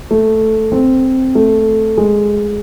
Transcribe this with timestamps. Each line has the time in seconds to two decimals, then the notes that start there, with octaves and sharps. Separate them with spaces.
0.11 A3
0.72 C4
1.35 A3
1.97 G#3